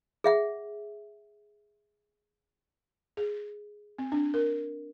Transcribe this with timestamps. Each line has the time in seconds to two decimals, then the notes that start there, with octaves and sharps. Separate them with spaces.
0.24 G#4 E5 F#5
3.17 G#4
3.99 C4
4.12 D4
4.34 A#4